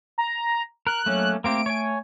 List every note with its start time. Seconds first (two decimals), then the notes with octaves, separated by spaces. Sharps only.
0.18 A#5
0.87 A#4 F#6
1.06 F#3 A3 A#3 C#4
1.44 A3 A#3 C4 G4 D7
1.66 C#5 G#5